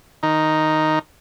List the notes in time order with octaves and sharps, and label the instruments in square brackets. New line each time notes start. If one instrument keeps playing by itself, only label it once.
[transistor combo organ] D#3 D#4